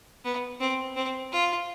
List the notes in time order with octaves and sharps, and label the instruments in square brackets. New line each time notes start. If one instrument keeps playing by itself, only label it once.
[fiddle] B3
C4
C4
F4